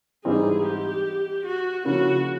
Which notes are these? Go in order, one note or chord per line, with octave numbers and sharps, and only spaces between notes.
G#2 E3 G3 C4 D#4 G#4
G4
F#4
C#3 F3 A#3 C#4 E4 F#4